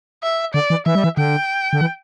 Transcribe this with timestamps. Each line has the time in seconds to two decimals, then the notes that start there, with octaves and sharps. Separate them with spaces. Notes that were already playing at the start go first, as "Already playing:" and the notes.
0.23 E5
0.54 D3 D5
0.70 E3
0.86 E3 E5
0.95 G3
1.04 E3
1.17 D3 G5
1.73 D3
1.81 E3